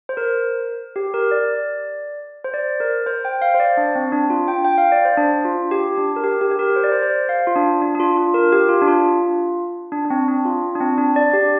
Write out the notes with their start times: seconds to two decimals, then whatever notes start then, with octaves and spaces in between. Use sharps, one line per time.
0.09 C5
0.17 A#4
0.96 G4
1.14 A#4
1.31 D5
2.44 C5
2.54 D5
2.80 A#4
3.06 C5
3.25 G5
3.42 F5
3.54 C5
3.60 D5
3.77 D4
3.95 C4
4.12 D4
4.30 F4
4.48 G5
4.65 G5
4.78 F5
4.92 D5
5.05 C5
5.17 D4
5.45 F4
5.71 G4
5.98 D4
6.16 A#4
6.24 G4
6.41 G4
6.51 G4
6.59 A#4
6.76 C5
6.84 D5
6.92 C5
7.02 C5
7.29 F5
7.47 F4
7.56 D4
7.82 D4
7.95 D4
8.00 F4
8.17 F4
8.34 A#4
8.52 G4
8.69 F4
8.82 D4
8.88 F4
9.92 D4
10.05 D4
10.10 C4
10.28 D4
10.45 F4
10.75 D4
10.80 C4
10.98 D4
11.16 D5
11.33 G4